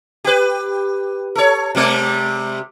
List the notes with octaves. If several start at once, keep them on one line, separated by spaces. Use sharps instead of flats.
G4 B4
A4 C#5
C3 G3 G#3